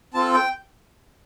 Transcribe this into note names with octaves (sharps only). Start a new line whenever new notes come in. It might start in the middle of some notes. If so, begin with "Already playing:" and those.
C4 F4 A4 A5
G5